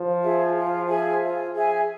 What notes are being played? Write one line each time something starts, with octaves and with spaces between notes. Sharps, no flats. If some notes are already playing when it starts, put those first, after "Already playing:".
Already playing: F3
F4 G#4 E5
F4
G#4 E5 G#5
F4
G#4 E5 G#5